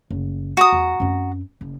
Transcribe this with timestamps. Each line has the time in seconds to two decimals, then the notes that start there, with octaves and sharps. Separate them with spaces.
0.11 F#1
0.57 F#4 A#5 D#6
0.72 E2
1.00 F#2 C4
1.61 F#1